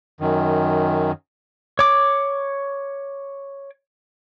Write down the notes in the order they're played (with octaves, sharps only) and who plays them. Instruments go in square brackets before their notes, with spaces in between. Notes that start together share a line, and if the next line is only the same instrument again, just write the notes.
[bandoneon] F#2 D#3
[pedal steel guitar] C#5 D6